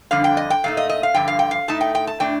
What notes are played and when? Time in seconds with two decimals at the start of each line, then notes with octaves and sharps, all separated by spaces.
0.11 F2 D3 G3 D4 F5
0.24 G5
0.37 D#5
0.50 G5
0.64 A#2 A3 D#4 F5
0.77 D#5
0.89 D#5
1.03 F5
1.14 G2 D3 F3 G5
1.28 F5
1.39 G5
1.51 F5
1.68 A2 A3 D#4 A5
1.81 G5
1.95 G5
2.07 A5
2.20 A2 A3 D4 G5